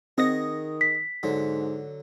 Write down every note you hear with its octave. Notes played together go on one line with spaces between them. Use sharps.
D#3 C4 G#4 D#5 F#5 A#6
B6
G#2 D3 F#3